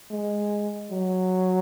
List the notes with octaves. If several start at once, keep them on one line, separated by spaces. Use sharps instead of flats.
G#3
F#3